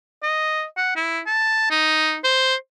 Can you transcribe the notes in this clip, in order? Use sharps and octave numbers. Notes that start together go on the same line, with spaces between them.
D#5
F#5
E4
A5
D#4
C5